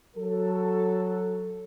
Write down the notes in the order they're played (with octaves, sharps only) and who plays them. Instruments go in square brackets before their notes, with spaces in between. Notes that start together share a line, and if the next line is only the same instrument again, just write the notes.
[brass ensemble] F#3 A4